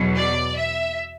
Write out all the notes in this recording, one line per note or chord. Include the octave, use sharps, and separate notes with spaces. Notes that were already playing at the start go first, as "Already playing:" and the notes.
Already playing: E2 B2 F#3
D5
E5